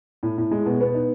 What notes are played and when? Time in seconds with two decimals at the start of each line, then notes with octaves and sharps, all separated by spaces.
0.23 A2
0.38 A2
0.51 G#3
0.66 B2
0.81 B3
0.94 D#4